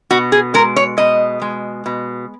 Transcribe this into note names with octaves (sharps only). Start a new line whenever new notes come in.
B2 F#4
G#4
G#3 A#4
C#5
B2 D#5
G#3
B2